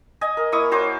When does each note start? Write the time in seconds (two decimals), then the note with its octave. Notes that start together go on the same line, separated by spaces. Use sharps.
0.21 D#5 G#5
0.37 A#4
0.52 A#3 E4 C#6 D#6
0.71 F#4 C5 C#5 D6